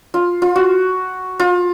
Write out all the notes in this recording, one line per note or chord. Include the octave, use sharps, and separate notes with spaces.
F4
F4
F#4
F4